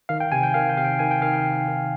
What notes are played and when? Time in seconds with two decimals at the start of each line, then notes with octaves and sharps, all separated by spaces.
0.09 D#3 F5
0.20 G5
0.32 C3 G#5
0.43 G5
0.54 D#3 F5
0.69 G5
0.77 C3 F5
0.84 G5
0.99 D#3 G#5
1.11 G5
1.22 D#3 F5
1.33 G5
1.45 C3
1.68 D#3